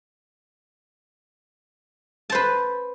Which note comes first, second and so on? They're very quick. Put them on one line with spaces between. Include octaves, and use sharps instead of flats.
A5 C5 B4